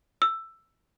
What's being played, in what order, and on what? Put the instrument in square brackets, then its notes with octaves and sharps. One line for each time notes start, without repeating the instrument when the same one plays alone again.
[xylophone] E6